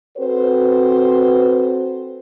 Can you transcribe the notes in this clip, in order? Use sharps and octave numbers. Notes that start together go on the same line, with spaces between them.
C4 F#4 A4 B4 C5